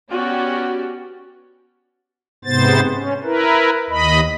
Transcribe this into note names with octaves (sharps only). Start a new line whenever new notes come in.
B3 C#4 F#4 G4 D5
G#2 C3 B3 C5 A6
C#4
E4 A#4 B4
D#2 D#5 B5